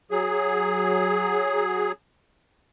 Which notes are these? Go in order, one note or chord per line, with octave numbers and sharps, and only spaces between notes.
F#3 G#4